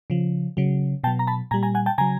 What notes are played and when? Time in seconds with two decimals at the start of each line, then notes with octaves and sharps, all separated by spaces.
0.10 C#3 F3
0.57 C#3 F#3
1.04 B2 G5 A5
1.07 F#3
1.19 A#5
1.27 A5 B5
1.51 A#2 G3 G#5 A#5
1.63 G#5 A#5
1.75 F#5 G#5
1.86 G5 A5
1.98 C#3 F#3 G#5 A#5